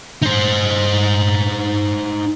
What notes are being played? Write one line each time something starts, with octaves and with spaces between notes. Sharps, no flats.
D#4 C5